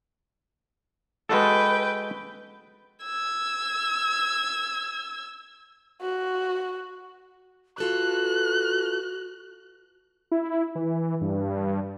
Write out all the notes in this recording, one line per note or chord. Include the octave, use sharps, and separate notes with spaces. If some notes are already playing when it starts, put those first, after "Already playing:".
G#3 F#4 A4 B4 G5
E6 G#6
F#4
F4 F#4 A4 B4 F#6
E4
E3
G2